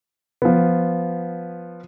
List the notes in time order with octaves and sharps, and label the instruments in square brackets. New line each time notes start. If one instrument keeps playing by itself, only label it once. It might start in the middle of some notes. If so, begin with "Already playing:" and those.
[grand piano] F3 B3